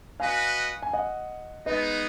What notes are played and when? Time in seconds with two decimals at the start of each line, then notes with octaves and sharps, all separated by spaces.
0.20 F#4 B4 D#5 F5 G#5
0.83 G#5
0.93 D#5 F#5
1.66 G#3 B3 D#4 B4 D#5